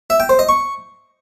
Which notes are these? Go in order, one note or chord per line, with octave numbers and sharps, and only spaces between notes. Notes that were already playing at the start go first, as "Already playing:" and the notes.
E5
G5
C5
D#5
C#6